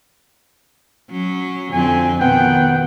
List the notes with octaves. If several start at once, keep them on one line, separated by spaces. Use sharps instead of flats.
F#3 C#4
F2 D3 C4 G#5
B2 D#3 B3 F#5 G5